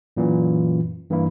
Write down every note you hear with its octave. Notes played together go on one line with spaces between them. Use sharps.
F#2 A#2 E3
G2 E3 A#3 E4